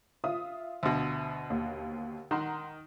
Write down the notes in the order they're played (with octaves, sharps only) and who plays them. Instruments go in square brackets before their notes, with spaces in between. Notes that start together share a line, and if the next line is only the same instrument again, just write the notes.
[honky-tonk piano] F4 E5 D#6
[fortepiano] D2 B2
[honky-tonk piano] D#2
[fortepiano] D#3 [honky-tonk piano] F#5 A#5 C6